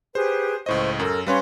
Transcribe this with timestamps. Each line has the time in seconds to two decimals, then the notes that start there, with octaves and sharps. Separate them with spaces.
0.15 G4 G#4 B4 C5
0.66 C#2 A2 C5 D#5 C#6
0.99 F#2 A4 A#4
1.27 G3 C#4 B4 C#5 F5 C6